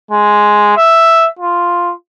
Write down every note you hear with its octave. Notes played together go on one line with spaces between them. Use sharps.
G#3
E5
F4